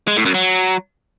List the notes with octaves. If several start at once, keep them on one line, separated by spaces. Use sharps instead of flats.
G#3
A2
F#2
F#3